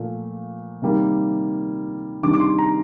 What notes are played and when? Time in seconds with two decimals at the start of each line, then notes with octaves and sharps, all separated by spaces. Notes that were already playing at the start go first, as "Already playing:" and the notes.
Already playing: A#2 F3 A3
0.82 C3 D#3 G3 A#3
2.23 C3 D#3 G3 D4 D6
2.33 D6
2.40 C6
2.58 A#5